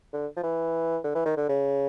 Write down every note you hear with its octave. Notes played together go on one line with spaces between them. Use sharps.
D3
F3
E3
D3
E3
D#3
D3
C#3